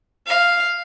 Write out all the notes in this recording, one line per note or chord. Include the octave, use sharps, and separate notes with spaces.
F5